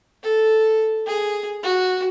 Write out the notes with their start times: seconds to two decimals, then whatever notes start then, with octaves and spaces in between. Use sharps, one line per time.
0.23 A4
1.06 G#4
1.63 F#4